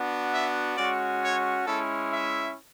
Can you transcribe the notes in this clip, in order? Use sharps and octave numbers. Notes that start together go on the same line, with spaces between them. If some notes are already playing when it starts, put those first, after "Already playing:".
Already playing: B3 D4 F#4
E5
G#3 C#4 F#4 D5
C#5
G#3 C#4 E4 A4
E5